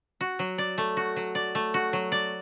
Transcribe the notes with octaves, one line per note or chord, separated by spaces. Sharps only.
F#4
F#3
D5
A3
F#4
F#3
D5
A3
F#4
F#3
D5